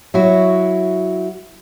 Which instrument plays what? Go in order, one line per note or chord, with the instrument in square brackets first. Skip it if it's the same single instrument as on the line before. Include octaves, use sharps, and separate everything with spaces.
[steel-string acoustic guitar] F#3 E4 F#4